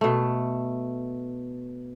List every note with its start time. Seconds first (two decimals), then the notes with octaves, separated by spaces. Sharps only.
0.01 B2 A3